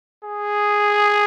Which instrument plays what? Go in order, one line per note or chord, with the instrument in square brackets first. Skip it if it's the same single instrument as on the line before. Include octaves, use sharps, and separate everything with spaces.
[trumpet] G#4